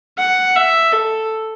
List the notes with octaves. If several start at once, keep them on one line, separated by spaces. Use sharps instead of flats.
F#5
E5
A4